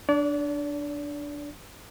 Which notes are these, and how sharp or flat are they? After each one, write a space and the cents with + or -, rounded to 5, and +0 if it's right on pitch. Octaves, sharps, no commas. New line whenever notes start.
D4 +0 D5 -35